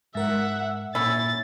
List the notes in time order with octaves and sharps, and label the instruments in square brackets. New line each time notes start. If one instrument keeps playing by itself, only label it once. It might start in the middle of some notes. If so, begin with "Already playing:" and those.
[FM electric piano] G#2 A#4 [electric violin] E5 F#5
[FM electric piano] A#2 [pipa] C#4 E4 [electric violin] A6